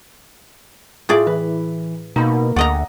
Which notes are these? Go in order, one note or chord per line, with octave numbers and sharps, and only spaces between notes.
A2 F4 G#4 D5
E3 B4
B2 A#3 D#4 B5
D2 D5 D#5 F#5 A#5